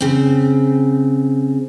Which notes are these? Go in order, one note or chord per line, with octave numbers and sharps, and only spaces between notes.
C#3 C4